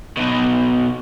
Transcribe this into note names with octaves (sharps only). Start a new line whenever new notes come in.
B2 D#4